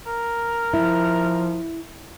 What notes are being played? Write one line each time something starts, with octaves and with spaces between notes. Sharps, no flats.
A#4
F3 E4